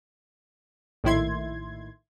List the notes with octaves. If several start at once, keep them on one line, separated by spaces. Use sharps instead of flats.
A#1 A2 D#3 E4 C6 G#6